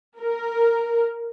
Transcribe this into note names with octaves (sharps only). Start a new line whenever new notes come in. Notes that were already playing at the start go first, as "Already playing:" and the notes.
A#4